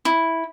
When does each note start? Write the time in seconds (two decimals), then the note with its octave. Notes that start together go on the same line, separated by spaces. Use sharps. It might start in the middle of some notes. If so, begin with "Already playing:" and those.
0.05 E4